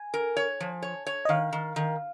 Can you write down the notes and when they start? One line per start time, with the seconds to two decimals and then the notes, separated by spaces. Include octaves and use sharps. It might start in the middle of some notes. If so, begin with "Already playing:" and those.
Already playing: G#5
0.14 A#4
0.37 C#5
0.60 F3
0.82 C#5
1.07 C#5
1.25 D#5
1.29 D#3 F5
1.53 D#3
1.76 D#3